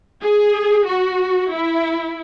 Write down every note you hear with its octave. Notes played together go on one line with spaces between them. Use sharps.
G#4
F#4
E4